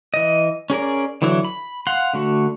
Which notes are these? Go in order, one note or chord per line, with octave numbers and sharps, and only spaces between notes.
E3 D#5
C#4 G#4 A#4 D5
D3 E3 F#3 E4
B5
F5 F#5 C6
D3 A3 F#4